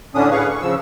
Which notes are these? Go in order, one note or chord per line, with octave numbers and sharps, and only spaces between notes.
A2 D3 C#4 D4 D#6
G#4 B4 F5 C#6
C#6
C#3 F3 E6